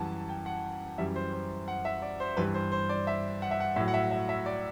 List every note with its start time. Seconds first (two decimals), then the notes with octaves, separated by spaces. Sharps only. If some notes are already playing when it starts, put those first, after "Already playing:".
Already playing: F#2 E3 G3 F#5 A5
0.29 G5
0.46 F#5
0.98 F#2 E3 G3 E5
1.16 C5
1.32 C5
1.68 F#5
1.85 E5
2.02 D5
2.20 C5
2.37 G2 E3 G3 B4
2.54 C5
2.72 C5
2.89 D5
3.07 E5
3.42 F#5
3.51 E5
3.60 F#5
3.76 A2 F#3 E5
3.88 F#5
3.94 E5
4.11 E5
4.29 E5
4.46 D5